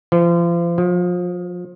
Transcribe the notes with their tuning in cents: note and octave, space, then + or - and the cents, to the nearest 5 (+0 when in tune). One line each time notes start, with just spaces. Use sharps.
F3 -35
F3 +30